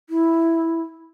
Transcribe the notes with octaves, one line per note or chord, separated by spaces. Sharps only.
E4